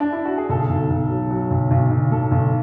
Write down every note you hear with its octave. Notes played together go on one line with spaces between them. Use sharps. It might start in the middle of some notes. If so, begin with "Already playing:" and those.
D4
E4
F#4
G#4
B1 A4
B1
B1
F#3
F#3
B1
B1
B1
A2 A4
B1